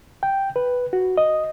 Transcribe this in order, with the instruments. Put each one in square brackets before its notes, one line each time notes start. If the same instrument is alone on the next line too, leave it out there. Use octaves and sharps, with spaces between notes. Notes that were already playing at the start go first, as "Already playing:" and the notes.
[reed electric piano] G5
B4
F#4
D#5